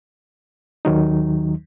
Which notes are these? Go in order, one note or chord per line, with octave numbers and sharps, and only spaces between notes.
D#2 D#3 F#3 D#4